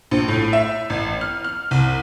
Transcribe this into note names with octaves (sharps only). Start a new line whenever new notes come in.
A#1
A2
E5
A1
F6
F6
C2